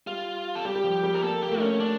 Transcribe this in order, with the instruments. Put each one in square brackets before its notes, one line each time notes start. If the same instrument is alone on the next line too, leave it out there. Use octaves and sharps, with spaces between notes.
[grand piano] G3 [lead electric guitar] F4
[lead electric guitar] A4
[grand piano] G3 [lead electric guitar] G4
[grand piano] G3
F3
G3
[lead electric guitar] A#4
[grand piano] A#3 [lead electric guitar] A4
[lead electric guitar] G4
[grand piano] A#3
A3
[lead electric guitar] C#4
D4